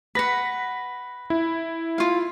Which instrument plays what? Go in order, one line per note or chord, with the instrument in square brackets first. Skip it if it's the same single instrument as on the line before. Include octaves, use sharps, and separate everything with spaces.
[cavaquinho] B4 F#5 [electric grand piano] A#6 B6
[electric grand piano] E4
[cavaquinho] F4 F5